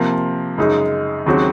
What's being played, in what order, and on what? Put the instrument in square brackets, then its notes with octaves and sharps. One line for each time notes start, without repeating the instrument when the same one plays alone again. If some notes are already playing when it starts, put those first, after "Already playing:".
Already playing: [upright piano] C3 F3 A#3
F#2 C#3 G#3 D#4
D#2 C#3 F#3 C4 F#4